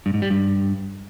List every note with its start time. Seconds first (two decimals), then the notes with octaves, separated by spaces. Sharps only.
0.06 G2
0.14 G#2
0.22 G3
0.30 G2